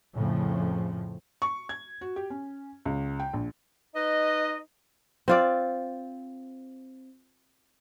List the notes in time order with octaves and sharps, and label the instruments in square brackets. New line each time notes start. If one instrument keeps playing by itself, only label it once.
[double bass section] F2 A2 C#3 F3
[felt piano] C#6
G#6
F#4
G4
C#4
C#2
G5
A#1
[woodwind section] D#4 B4 D#5
[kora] C4 F4 D5